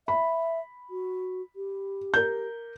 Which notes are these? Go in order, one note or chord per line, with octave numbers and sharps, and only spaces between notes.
E5 B5
F#4
G4
A#4 G6